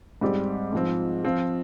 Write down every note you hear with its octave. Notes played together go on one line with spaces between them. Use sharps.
G#2 G3 C4 G4
G#2 F3 C4
F3 C4 F4